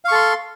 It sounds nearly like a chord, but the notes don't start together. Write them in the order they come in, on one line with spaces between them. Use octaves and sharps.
F5 C#6 A4 C6